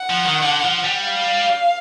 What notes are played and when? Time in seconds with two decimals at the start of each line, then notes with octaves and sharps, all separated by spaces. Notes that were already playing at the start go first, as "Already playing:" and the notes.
Already playing: F#5
0.10 F3
0.26 D#3
0.42 D3
0.64 F3
0.85 G3
1.06 F5